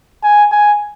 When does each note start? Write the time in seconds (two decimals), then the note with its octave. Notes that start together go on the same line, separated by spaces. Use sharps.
0.23 G#5
0.52 G#5